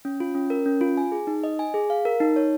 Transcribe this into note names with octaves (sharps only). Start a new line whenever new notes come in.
C#4
F4
C#4
A#4
C#4
F4
G#5
G#4
D#4
D#5
G#5
G#4
F5
A#4
D#4
C#5